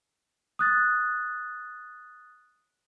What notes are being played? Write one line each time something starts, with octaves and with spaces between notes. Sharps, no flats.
D#6 F#6 A6